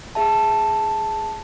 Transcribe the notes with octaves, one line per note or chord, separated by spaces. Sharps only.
G#4 E5 A5